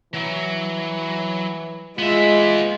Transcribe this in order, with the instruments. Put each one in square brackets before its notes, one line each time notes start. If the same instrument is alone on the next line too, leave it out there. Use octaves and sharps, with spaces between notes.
[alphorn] E3 [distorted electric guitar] F#3
[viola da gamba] G#3 [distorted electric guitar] B3 E5 [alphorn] F4